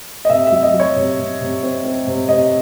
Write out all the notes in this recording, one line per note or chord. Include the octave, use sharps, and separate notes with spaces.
D#5
C3 E5
E5
F#3
D#5
F#3
C#5
C3
C3
C3
C4
C4
C3
C3 D#5